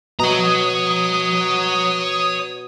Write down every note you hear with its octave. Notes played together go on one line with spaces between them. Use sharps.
B2 C#5 A#5 D#6